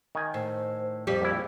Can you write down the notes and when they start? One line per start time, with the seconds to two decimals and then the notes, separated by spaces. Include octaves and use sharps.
0.15 D#3 G#5
0.34 A2 C5
1.07 F2 G3 G4 C5
1.22 A#1 E4